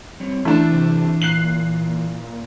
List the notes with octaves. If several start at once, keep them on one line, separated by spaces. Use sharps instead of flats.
G3 C4 C#5
E3 A3 D4 E4 F#5 A5
C3
A#2 F#6 C7 F#7